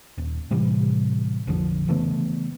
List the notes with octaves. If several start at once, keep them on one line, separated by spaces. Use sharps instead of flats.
D#1
A2 C3 E3 G3
A#1 F2 D3 F3
C#3 E3 A3 B3